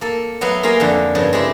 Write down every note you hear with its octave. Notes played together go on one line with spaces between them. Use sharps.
A#3 A4
F#3 B3 E5 F5
A#3 F4 G#4 A#4 F5 G#5
F2 D3
G2 C#3 F3
G#3 C4 E4 G4